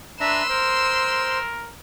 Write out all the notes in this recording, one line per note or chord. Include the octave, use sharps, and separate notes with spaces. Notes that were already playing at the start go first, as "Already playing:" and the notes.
D4 B4 E5 A#5 C6 E6
A#4 C5